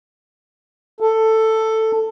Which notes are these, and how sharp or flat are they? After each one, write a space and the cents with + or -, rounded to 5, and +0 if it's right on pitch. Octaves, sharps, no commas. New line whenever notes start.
A4 +10